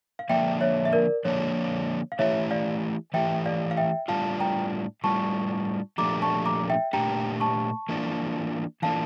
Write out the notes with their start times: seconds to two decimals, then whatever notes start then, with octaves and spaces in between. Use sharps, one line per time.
0.19 F5
0.29 D3 F3 A#3 D4 E5 G5
0.61 C#5 E5
0.85 E5
0.93 A#4 D5
1.24 D3 F3 A#3 D4 C#5
2.12 F5
2.19 E3 A3 E4 G4 C#5 E5
2.51 D5 F5
3.14 E3 A3 E4 G4 E5 G5
3.45 D5 F5
3.71 F5
3.77 E5 G5
4.08 A2 G3 D4 F4 F5 A5
4.40 G5 A#5
5.04 A2 G3 D4 F4 A5 C#6
5.98 A#2 F3 A3 D4 G4 A#5 D6
6.22 A5 C#6
6.46 A#5 D6
6.70 E5 G5
6.93 A#2 F3 A3 D4 G4 G5 A#5
7.40 A5 C#6
7.89 E3 A#3 D4 F4
8.82 E3 A#3 D4 F4 F5 A5